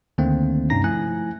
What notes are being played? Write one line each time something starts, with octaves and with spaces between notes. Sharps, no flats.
D2 D3 D#3 A3 A#3 C4
G2 C3 C#4 D#4 A#5 A#6
F3 A3 E4 G#5 F#6